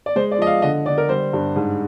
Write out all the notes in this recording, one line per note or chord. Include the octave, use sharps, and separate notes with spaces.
D5
G#3 C5
D5
F3 D#5
F5
D3 D#5
D3 D5
A#4
G3 C5
G2
G#2